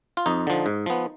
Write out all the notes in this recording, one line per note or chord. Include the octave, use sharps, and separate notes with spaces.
F4
F2 D#4
D3 F3
G#2
F3 B3